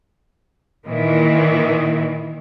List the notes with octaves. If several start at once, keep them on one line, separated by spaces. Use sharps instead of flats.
A#2 D#3 E3